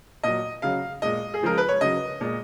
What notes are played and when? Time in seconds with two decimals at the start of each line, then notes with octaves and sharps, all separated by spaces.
0.23 A#2 F#3 D#5
0.62 C#3 F#3 F5
1.02 A#2 G#3 D#5
1.34 G#4
1.42 C#3 F3 G#3 A#4
1.58 B4
1.68 C#5
1.81 C#3 F#3 D#5
2.21 A#2 G#3